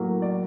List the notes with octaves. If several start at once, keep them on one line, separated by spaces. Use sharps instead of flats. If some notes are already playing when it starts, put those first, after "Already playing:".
Already playing: A2 F#3 A#3
D5